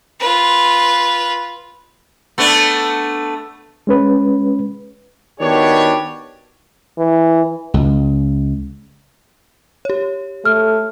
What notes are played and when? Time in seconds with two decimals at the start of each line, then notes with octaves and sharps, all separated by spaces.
0.20 F4 B4
2.38 A3 B3 D4
3.87 G#3 C#4 B4
5.40 D#3 B3 D4 F#4 G4 C#5
6.99 E3
7.74 C#2
9.85 G4 C#5
10.45 A3 F6